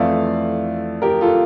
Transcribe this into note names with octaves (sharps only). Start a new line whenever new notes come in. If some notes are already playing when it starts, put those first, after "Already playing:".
Already playing: F2 E3 A3 E4 D5 F5
G4 A#4
F4 A4